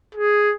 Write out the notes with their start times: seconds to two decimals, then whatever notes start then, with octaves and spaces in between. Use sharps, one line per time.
0.15 G#4